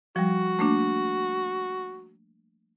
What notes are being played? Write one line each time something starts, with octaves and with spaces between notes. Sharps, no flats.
F3 G3 F#4
A3 A#3 D4